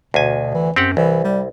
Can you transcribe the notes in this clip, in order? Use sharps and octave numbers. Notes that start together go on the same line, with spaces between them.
D2 B2 G#5
E3
F#2 C4 G4 F#5
C2 E3
G3